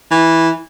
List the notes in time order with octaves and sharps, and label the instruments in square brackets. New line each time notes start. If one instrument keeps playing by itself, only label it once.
[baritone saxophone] E3